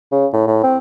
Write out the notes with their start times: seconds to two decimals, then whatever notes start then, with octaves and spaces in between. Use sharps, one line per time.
0.12 C#3
0.33 A2
0.47 A2
0.64 C4